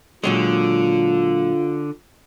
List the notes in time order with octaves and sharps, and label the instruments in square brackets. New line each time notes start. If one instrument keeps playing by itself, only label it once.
[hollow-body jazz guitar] A#2 F#3 G#3 [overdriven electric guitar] D3 [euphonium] F4